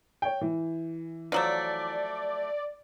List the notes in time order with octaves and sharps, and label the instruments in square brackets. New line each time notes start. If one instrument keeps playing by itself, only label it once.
[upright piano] C#5 G5
E3
[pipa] F3 F#3 A3 [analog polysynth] D5